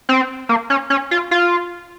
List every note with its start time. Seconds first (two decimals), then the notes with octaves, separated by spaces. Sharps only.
0.09 C4
0.49 A#3
0.70 C#4
0.90 C#4
1.11 F4
1.31 F4